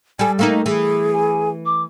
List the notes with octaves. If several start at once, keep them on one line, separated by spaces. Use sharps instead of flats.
G3 A4 G#5
A3 A#3 D#4 F5
E3 G#4
G#5
D6